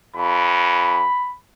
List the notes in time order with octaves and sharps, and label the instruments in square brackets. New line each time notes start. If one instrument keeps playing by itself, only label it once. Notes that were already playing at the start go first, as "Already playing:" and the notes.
[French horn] F2 [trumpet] B5